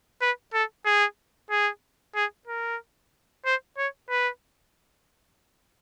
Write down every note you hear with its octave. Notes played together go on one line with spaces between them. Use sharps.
B4
A4
G#4
G#4
G#4
A#4
C5
C#5
B4